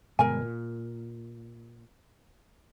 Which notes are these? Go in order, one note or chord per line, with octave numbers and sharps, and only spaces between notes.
G1 B2 G#3 A#4 G#5
A#2